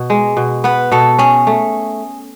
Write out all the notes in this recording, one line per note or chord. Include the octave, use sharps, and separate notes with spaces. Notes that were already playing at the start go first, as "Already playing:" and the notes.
Already playing: B2
G#3
B2
B3 B4
B2 A4
C#4 G#4
A3